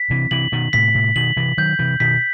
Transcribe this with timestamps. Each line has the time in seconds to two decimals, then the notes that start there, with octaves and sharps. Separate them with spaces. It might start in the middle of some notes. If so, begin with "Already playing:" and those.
Already playing: B6
0.10 C3 E3
0.31 C3 E3 F#7
0.52 B2 D#3
0.73 A2 C3 B6
0.95 A2 C3
1.16 B2 D#3 F#7
1.37 C3 E3
1.58 D#3 F#3 G6
1.79 C3 E3
2.00 B2 D#3 B6